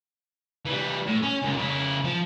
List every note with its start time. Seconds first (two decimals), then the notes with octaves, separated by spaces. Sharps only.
0.65 E3 G3
1.07 A2
1.23 C#4
1.42 C#2 A#2
1.56 C#3 E4
2.04 F3